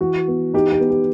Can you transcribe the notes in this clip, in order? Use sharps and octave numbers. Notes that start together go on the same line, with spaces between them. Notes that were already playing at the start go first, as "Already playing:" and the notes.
E3 F#4
B3
D#4 G4
G4
B3
G4